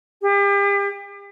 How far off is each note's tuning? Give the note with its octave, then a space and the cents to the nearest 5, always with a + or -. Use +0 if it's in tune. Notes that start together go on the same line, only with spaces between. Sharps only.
G4 +40